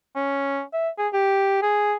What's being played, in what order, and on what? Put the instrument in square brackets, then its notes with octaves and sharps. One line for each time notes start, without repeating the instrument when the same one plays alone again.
[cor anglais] C#4
E5
G#4
G4
G#4